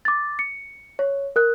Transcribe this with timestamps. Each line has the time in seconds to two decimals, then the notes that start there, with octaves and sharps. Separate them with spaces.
0.05 D6 A6
0.39 C#7
0.99 C#5
1.36 A#4 F#6